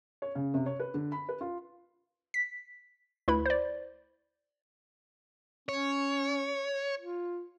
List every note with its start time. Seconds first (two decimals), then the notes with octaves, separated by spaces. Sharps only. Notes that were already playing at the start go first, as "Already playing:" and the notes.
0.22 C#5
0.35 C#3
0.54 C3
0.66 C#5
0.80 B4
0.94 D3
1.12 B5
1.29 B4
1.41 F4
2.34 B6
3.28 D2 E4 B4 B5
3.46 C5 D5
5.69 C#4 C#5
6.99 F4